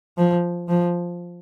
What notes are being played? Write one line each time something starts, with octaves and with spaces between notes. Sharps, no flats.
F3
F3